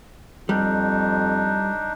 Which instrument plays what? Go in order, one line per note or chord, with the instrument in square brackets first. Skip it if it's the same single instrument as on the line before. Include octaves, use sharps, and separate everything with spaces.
[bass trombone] F2 [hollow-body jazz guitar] G3 [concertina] D4 D#4